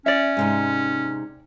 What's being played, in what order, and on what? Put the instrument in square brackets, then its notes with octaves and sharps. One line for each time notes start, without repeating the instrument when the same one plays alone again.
[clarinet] C#4 [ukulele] D5 E5
[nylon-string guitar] G#2 C3 D#4